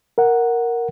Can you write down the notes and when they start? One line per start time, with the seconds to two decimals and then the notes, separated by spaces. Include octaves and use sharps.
0.18 A#4 F#5